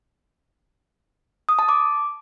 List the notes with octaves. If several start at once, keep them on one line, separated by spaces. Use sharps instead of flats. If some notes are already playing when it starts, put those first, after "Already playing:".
D#6
A5
D6